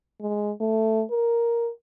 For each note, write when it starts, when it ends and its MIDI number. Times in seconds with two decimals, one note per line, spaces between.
0.21 0.51 56
0.60 1.03 57
1.11 1.69 70